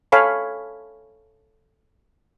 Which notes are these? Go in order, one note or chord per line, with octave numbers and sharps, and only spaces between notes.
A4 C#5 F5 G#5 B5